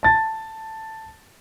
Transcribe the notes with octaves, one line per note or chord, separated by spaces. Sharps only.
A5 A6